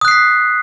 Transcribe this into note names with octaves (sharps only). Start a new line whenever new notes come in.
D#6 F#6 B6 C7